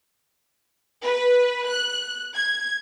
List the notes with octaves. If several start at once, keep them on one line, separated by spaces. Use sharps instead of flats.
B4
F#6
G#6